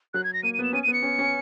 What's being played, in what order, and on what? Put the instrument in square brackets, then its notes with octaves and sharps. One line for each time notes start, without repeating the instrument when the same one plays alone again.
[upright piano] F#3 [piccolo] F#6
[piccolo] G#6
A#6
[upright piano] A#3 [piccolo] D#7
[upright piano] B3 [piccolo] D#7
[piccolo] E7
[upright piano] C#4 [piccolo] D#7
[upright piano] B3 [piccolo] D#7
[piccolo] C#7
[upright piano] C#4
C#4